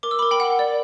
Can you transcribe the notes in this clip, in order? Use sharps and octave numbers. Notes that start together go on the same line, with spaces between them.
A#4 D6
E6
A#4 B5 D6
G5 B5
F#5
D5